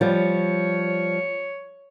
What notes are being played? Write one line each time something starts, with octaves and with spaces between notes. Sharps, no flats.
F3 G3 C#5